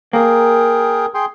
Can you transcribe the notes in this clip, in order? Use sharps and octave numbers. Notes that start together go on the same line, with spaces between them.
A#3 G#4 A#4 G5
G#4 G5 C6